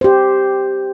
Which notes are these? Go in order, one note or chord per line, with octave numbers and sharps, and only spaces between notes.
G4 C5